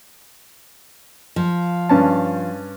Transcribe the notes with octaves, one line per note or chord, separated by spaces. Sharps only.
F3
G2 C#4 A5